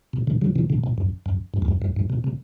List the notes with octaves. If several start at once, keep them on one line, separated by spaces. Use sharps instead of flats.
B2
B2 D3
D3 F#3
C3 E3
B2 D3
B2
F#2
F#2
G2
E2
F#2
F#2
G2
B2
C3